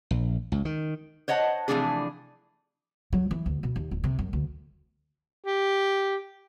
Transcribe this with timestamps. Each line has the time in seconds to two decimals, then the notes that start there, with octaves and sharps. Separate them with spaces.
0.11 A#1
0.52 C#2
0.65 D#3
1.28 C5 C#5 D#5 F#5 A5
1.68 C3 E3 F3 A3 D4 G#4
3.13 F#3
3.31 E3
3.46 D2
3.63 B2
3.76 D#2
3.91 D1
4.04 C3
4.19 F#2
4.33 D2
5.45 G4